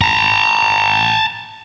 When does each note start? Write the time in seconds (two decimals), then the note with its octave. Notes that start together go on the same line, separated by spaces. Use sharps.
0.01 A5 A#5